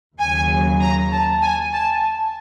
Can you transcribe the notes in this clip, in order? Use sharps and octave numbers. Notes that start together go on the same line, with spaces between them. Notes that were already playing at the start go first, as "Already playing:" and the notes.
D#2 C#3 F#3 G#5
A#5
A5
G#5
A5